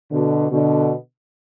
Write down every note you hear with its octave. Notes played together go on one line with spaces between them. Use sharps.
B2 D3
B2 D3